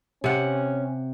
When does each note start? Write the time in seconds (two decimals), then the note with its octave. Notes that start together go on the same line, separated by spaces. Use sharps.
0.24 C3 C#4 F#5